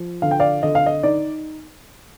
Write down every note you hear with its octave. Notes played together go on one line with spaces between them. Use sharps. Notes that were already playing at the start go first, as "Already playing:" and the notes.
Already playing: F3
D3 F5
G5
D5 F5
D3 D#5
F5
D#5
D#4 D5